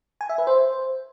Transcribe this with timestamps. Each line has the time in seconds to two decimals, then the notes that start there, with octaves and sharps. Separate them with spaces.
0.21 G#5
0.29 E5
0.38 B4
0.47 C5